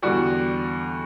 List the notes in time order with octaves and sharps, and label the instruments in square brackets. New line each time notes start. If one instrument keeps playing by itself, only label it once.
[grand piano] E2 D3 G3 F#4